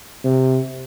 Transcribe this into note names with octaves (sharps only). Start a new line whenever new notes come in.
C3